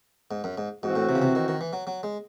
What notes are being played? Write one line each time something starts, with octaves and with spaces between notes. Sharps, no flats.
G#2
F#2
G#2
G#2 E3 C4 F#4
A2
C3
C#3
C3
D#3
D#3
E3
F#3
F#3
G#3